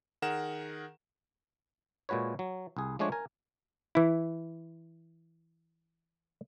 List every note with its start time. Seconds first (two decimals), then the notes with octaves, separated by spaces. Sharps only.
0.22 D#3 G#4 A#4 F#5 E7
2.09 A#2 G#3 F#4 B4 C#5
2.39 F#3
2.77 C2 G#4
2.99 F3 G#3 A3 D4 C#5
3.12 A#4 G#5
3.95 E3 E4